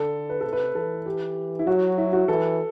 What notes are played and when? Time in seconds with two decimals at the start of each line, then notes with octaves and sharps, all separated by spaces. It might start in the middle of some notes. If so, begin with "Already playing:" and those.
Already playing: D3 A4
0.29 B4
0.41 C3 A4
0.53 B4
0.75 E3 A4
1.06 G4
1.59 E4
1.67 F#3 F#4
1.98 E4
2.13 F#4
2.28 E3 A4